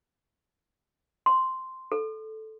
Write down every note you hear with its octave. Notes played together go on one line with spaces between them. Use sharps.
C6
A4